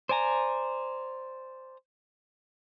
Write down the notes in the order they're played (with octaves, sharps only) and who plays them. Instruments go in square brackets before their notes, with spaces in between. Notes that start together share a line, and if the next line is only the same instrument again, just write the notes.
[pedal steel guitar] C5 D5 G#5 A#5